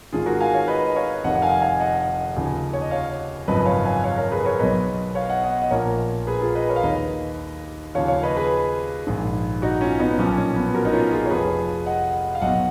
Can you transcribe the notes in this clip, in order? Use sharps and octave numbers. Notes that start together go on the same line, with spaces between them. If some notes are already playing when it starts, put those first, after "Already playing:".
G#1 G#2 D#3 F4 G#4
F#4 A#4
F5 G#5
C#5 F5
B4 D#5
D#5
C#5 F5
F1 F2 D#3 D#5 F#5
F#5
F5 G#5
F5 G#5
D#5 F#5
D#2 C#3 F3
C#5
D#5
C#5 F5
G#1 F#2 C#3 F3 B4 D#5
C#5 F5
F5 G#5
C#5 F5
A#4 C#5
G#4 B4
A#4 C#5
B1 B2 B4 D#5
C#5 F5
D#5 F#5
D#5 F#5
D#5
A#1 A#2 F3 A#4 C#5
G#4 B4
F4 G#4
B4 D#5
A#4 C#5
F5
D#2 D#3 B4 D#5
D#2 C#3 F3 C#5 F5
C#5 F5
B4 D#5
G#4 B4
A#1 G#2 D#3
D#4 F#4
C#4 F4
B3 D#4
B1 A#2 F3 C#4
C#4
B3
F#4 A#4
D#4
C#4 F4
F4 G#4
C#5
F1 F2 F3 G#4 B4
D#5 F#5
F5
B1 B2 D#5 F#5